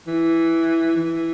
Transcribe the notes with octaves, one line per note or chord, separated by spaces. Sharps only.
E3
E3